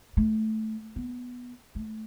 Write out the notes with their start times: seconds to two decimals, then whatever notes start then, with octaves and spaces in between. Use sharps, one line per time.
0.17 A3
0.96 B3
1.75 A3